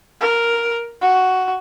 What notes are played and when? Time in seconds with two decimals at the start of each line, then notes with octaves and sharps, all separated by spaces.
0.21 A#4
1.01 F#4